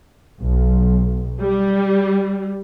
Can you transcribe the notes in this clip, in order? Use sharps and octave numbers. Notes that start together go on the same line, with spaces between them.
B1
G3